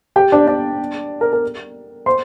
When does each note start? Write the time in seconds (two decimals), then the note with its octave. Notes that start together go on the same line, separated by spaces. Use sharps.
0.16 G4 G5
0.32 D4 D5
0.47 D4 D5
1.21 A#4
1.33 A#4
2.06 C5 C6